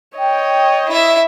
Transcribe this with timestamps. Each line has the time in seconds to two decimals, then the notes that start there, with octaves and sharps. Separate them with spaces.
0.17 C#5 D#5 G5
0.88 E4 E5